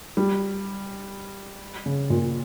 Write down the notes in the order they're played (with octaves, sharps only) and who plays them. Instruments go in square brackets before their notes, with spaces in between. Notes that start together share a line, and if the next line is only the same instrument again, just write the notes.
[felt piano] G3
C#3
A#2